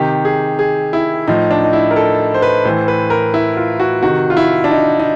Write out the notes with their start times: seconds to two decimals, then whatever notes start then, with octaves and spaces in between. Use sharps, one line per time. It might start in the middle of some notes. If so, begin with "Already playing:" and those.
Already playing: C3 D#3 G4
0.25 G#4
0.59 G#4
0.93 E4
1.28 A2 F3 D#4
1.51 D4
1.64 D#4
1.73 E4
1.91 A#4
1.96 A4
2.34 C5
2.42 B4
2.65 A2 E3 C5
2.88 B4
3.10 A#4
3.34 E4
3.57 F4
3.80 F#4
4.02 C3 D#3 F#4
4.30 F4
4.37 E4
4.64 D4
4.71 D#4
4.99 D#4